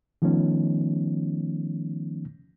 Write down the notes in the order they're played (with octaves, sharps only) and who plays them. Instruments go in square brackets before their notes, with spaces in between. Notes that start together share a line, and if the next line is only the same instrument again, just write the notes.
[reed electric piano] D#3 F3 A3 B3 C#4 D#4